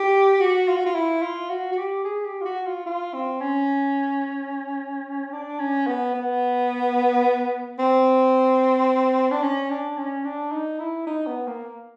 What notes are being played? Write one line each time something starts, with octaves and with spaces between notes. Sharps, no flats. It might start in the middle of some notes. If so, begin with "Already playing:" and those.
Already playing: G4
F#4
F4
F#4
F4
E4
F4
F#4
F#4
G4
G#4
G4
F4
F#4
F4
F4
C4
C#4
D4
C#4
B3
B3
C4
D4
C#4
D4
C#4
D4
D#4
E4
D#4
B3
A#3